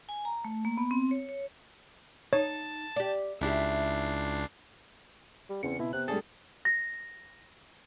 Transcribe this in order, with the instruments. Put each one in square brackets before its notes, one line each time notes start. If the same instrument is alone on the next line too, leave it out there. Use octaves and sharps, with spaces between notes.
[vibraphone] G#5
A#5
A3
A#3
B3
C4
C#5
C#5
[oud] D#4 [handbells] C#5 [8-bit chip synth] A5
[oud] G4 D5
[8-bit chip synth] C#2 D4 C7 [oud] E4 G4
[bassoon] G3
[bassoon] E2 [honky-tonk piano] C#3 C4 [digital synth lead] C#7
[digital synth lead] B2 [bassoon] E4
[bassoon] C3 [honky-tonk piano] B3 C4 [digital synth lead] F#6
[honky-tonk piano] A2 D5 G#5 [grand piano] G3 D4 G#4 [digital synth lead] A4
[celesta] A#6